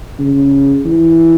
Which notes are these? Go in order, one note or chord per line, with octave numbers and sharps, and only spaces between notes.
C#3
E3